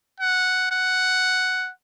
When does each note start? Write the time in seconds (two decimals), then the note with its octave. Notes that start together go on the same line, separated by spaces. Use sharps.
0.20 F#5
0.71 F#5